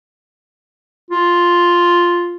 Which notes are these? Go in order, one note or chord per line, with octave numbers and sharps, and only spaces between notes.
F4